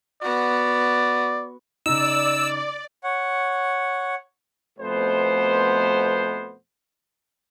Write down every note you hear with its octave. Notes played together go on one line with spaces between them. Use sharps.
B3 F#4 D5
C#3 D#4 D5 E6
C#5 F#5
F2 B2 A3 B3 C5